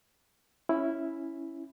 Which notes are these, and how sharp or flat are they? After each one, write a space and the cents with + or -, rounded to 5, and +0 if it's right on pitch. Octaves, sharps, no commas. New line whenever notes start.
C#4 +0 E4 +0